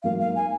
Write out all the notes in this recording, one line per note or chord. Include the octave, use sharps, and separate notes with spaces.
G#2 F#3 A#3 F5
F5
G#5